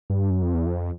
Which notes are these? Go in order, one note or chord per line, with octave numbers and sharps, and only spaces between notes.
G2
F#2
F2
E2
F2